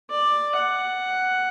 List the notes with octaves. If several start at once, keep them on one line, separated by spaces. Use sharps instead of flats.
D5
F#5